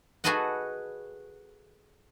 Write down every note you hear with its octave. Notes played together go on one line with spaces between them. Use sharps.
F#4 G#4 A4 B4 D#5 F#5